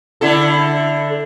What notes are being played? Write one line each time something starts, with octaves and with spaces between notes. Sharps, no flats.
D3 E4 A4